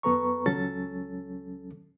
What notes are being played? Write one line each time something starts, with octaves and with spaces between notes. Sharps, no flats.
F#2 B3 A4 B4 A#5 C#6
C#2 F#3 C#4 A4 A6